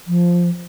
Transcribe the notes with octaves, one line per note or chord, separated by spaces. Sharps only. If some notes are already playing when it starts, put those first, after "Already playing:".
F3